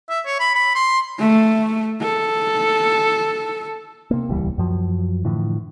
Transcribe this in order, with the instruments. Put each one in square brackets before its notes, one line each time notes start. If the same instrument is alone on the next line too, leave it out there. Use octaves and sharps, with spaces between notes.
[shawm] E5
C#5
B5
B5
C6
[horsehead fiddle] A3
A4
[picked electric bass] C3 A#3
D#1 C#2 E3 G3
F#2 F3 F#3
A2 D3 E3 F3